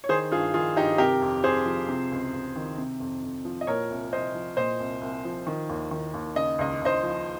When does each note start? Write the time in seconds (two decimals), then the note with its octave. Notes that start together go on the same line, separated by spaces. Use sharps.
0.04 C#5
0.09 D#3 G#4 C5
0.31 G2 F4 G#4
0.54 D#3 F4 G#4
0.77 G2 D#4 G4
0.98 C3 G4 A#4
1.21 F2
1.43 F2 G#4 C5
1.66 F3
1.88 C3
2.11 C#2
2.33 C#2
2.56 D#3
2.78 C3
3.00 F2
3.22 F2
3.45 F3
3.61 D#5
3.67 A#2 A#4 C#5
3.90 C2
4.13 C2 C5 D#5
4.35 F3
4.57 A#2 C5 D#5
4.80 C2
5.01 C2
5.25 F3
5.47 D#3
5.69 D#2
5.91 D#3
6.14 D#2
6.36 C#3 D#5
6.59 C#2 D#5
6.81 C#2 C5 D#5
7.04 F3